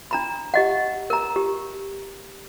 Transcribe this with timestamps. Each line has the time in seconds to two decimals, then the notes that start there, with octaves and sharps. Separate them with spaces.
0.11 D4 A#5 B5
0.54 G4 D#5 F#5
1.10 A#4 A#5
1.36 G4